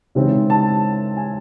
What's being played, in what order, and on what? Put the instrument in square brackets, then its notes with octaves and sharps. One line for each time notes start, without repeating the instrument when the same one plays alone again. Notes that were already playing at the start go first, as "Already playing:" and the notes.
[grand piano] C#3 E3 G#3 C4 D#4
A5
G#5